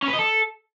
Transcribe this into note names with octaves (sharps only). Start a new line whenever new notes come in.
C#4
B4
D#5
A4